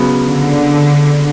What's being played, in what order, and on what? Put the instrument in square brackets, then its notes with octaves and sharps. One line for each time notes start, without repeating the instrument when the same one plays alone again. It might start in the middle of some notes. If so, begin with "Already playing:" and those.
Already playing: [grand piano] C#3 F#3 B3
[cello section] D3